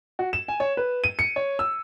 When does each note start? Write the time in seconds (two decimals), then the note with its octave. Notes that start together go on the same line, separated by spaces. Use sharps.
0.19 F#4
0.33 E7
0.48 G#5
0.60 C#5
0.77 B4
1.04 D#7
1.19 C#7
1.36 C#5
1.59 E6